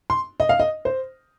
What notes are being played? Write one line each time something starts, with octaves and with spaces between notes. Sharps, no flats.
C6
D#5
F5
D#5
C5